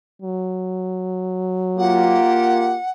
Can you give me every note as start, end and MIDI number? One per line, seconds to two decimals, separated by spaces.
0.22 2.21 54
1.78 2.77 58
1.78 2.77 65
1.78 2.77 67
1.78 2.91 78